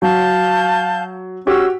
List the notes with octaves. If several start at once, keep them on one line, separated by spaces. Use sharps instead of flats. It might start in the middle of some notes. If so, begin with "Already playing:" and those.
F#3 F5 A5 G6
C#4 F#4 G4 E6